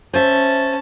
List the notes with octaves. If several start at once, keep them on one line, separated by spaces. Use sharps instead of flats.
C#4 C5 E5 A5